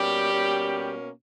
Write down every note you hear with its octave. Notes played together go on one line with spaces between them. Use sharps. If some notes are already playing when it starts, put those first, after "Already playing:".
Already playing: B2 G3 A#3 C#4 G4
B2 A#3 C#4